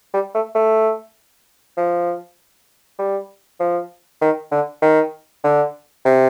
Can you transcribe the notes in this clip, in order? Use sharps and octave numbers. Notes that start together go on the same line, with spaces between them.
G3
A3
A3
F3
G3
F3
D#3
D3
D#3
D3
C3